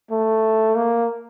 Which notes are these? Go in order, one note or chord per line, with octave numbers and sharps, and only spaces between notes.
A3
A#3